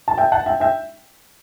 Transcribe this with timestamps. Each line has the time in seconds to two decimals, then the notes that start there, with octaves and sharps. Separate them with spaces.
0.08 A5
0.18 E5 G5
0.32 F#5 A5
0.46 E5 G5
0.60 E5 G5